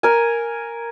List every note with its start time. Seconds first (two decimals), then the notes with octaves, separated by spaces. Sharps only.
0.03 A#4 G#5